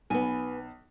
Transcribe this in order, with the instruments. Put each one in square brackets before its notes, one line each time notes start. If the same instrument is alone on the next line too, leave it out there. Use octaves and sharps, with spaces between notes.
[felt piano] B1 [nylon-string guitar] B3 G#5